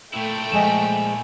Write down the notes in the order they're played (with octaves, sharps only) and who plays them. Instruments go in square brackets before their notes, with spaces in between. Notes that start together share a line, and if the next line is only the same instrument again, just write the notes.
[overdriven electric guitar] A#2 E4 [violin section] A3 G5
[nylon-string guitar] F3 G#3 D#5 [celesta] G#5 E7